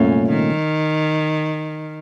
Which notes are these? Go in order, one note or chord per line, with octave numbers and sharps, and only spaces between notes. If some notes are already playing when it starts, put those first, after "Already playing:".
Already playing: C2 F#2 A#2 A3 C#4
D#3